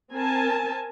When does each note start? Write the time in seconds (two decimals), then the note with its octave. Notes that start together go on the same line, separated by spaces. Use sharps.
0.12 C4 A#4 G#5 A5